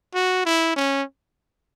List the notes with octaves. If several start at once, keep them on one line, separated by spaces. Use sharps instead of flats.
F#4
E4
C#4